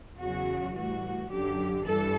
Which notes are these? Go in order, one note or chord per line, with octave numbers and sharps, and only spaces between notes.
E2 C#3 F#3 F#4
A2 E3 G3 F#4
F#2 D3 F#3 G4
G2 E3 G3 A4